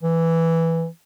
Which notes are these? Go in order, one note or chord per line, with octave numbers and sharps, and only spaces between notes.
E3